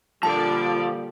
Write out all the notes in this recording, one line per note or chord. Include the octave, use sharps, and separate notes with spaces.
A#2 D3 F3 G3 D5 A5